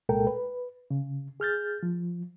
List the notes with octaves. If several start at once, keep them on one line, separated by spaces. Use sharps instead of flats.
C2 A#2 G#3 A4 A#4 G5
B4
C#3
G#4 F6 G6 A6
F3